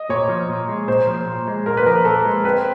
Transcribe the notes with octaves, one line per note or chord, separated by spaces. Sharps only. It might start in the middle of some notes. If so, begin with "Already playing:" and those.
Already playing: D#5
A#2 C#5
F3
A#2
G#3
A#2 C5
F3
A#2
G#3
A#2 A#4
B4
F3 A#4
A#2 A4
G#3
C4 B4